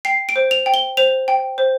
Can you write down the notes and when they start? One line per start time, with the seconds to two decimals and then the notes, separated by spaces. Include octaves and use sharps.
0.05 G5 C7
0.29 D7
0.36 C5
0.51 F7
0.66 G5
0.74 G7
0.97 C5 F7
1.28 G5
1.58 C5